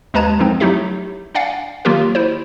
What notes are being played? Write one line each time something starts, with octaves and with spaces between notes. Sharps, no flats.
D#2 G#3 B4 A5 A#5 G#6
F#2 D3 F3 C4 D#4
F#3 A3 D#4 E4 G4 E5
D4 D5 F5 F#5 G#5
D#3 F#3 A#3 F4 G4 A#4
E4 C5